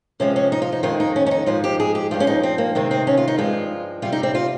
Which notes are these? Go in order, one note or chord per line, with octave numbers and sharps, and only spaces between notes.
C3 F3 G#3 C#4
C#4
D#4
F4
D#4
F2 D#3 G#3 F4
D#4
C#4
C#4
D#4
G#2 F3 G#3 F4
G4
G#4
G4
G2 F3 G#3 F4
C#4
D#4
C4
A#3
C3 D#3 G#3 C4
C4
C#4
F4
D#4
G2 F3 G#3 F4
C3 G3 F4
D#4
C4
F4